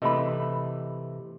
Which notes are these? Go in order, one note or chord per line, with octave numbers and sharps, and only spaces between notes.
C3 E3 A3 D#5 B5